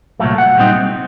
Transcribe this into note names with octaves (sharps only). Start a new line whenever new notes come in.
C2 A#2 F#3 A3
F#5
A#2 G3 C4 D#4